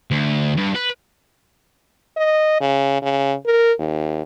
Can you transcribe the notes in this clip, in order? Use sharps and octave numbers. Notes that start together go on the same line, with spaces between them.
D2
G2
B4
D#5
C#3
C#3
A#4
D#2